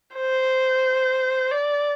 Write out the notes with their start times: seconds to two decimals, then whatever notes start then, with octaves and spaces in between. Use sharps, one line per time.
0.15 C5
1.51 D5